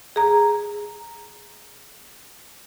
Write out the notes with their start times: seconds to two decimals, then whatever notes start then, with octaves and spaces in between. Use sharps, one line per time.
0.16 G#4 A#5